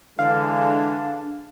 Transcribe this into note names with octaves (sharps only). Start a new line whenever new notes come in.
D3 E3 G#3 D4 F5